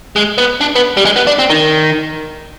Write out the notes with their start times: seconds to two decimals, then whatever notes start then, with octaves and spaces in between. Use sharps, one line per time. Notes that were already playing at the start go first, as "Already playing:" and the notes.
0.16 G#3
0.38 B3
0.61 D4
0.75 B3
0.97 G3
1.05 G#3
1.16 B3
1.27 D4
1.39 C4
1.50 D#3